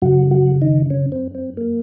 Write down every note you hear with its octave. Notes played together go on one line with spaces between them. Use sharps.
F#2 C#3 F#3 F#4
F#3 F#4
D#3 D#4
C#3 C#4
C4
C4
A#3